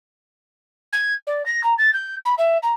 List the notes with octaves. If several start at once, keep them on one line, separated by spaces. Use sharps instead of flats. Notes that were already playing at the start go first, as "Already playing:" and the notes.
G#6
D5
A#6
A#5
A6
G6
B5
E5
A#5